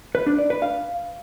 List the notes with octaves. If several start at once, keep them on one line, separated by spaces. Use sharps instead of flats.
B4
D4
D5
B4
F5